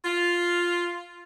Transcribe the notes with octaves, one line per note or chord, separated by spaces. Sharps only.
F4